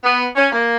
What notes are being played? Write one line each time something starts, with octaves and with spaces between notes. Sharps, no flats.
B3
C#4
A#3